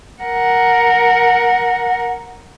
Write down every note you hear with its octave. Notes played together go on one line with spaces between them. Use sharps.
A#4 F#5